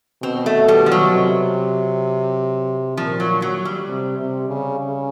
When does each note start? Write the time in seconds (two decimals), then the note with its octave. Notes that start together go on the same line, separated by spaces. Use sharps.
0.22 B2 C4
0.46 A3
0.68 G3
0.86 F3
0.92 F#3
1.14 C3
2.97 A#2 F3
3.20 F#3
3.42 F#3
3.65 G3
3.88 C3
4.18 C3
4.48 C#3
4.79 C#3